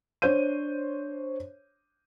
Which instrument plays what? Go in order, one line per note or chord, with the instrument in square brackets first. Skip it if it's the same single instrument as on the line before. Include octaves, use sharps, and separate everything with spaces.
[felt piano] D4 C5 C#5 G6 D#7